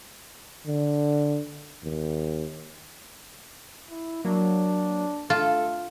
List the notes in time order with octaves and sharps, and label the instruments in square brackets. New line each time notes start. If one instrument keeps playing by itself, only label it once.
[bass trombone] D3
D#2
[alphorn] E4
[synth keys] F#3 A#3 [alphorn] D4
[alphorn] A3 [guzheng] F4 [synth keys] A4